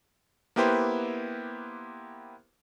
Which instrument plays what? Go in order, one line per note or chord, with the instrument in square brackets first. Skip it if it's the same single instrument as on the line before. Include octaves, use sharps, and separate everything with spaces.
[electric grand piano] A#3 B3 E4 G4 B4 C5